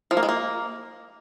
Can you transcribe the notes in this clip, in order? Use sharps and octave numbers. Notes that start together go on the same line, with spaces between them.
F3
A#3
G#3
A#3